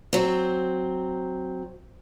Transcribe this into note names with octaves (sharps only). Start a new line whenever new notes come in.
F#3 C4